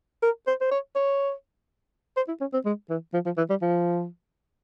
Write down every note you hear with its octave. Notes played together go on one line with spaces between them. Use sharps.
A#4
C5
C5
C#5
C#5
C5
E4
C#4
C4
G#3
E3
F3
F3
E3
G3
F3